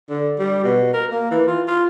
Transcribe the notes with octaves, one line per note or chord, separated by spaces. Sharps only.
D3
G3
B2
A#4
A#3
E3
F4
F4